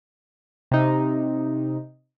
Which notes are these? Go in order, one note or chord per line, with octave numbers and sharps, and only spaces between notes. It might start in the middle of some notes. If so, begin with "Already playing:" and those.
C3 D#4